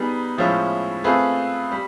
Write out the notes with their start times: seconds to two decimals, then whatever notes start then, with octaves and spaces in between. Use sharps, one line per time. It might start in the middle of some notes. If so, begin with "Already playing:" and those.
Already playing: G3 B3 D#4 G#4
0.37 A2 F3 G#3 C#4 E4
1.04 A3 C4 F4 G#4 B4
1.71 G3